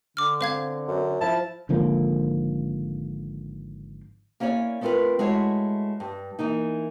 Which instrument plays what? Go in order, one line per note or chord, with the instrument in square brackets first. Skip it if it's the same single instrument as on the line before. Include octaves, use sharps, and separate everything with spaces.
[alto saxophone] D3 [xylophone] D6 F6
[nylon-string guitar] C4 [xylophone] C5 F5 G#6
[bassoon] F#2
[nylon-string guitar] F3 [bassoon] E4 [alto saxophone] A5
[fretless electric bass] G#1 D3 F3 A#3
[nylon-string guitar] A#3 C#4 E4 C#5 D5
A3 B3 C4 F4 A#4 B4
G#3 A3 E4 F#4 C#5
G2
E3 A#3 D#4